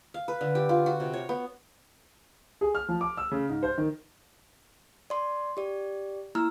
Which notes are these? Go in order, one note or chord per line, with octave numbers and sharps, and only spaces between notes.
F5
B4
D3
G4
F4
F#4
C3
C#5
B3
G#4
F6
F3
D6
E6
C#3
G#2
C5
D#3
D5 C6
G4 D5
A#3 E4 A#5 E6 F6